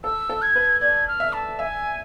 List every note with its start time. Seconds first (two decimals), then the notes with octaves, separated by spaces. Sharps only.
0.04 A4 E6
0.30 A4
0.42 G#6
0.56 B4
0.81 D5 G#6
1.08 F6
1.20 E5
1.33 A5
1.59 E5 G#5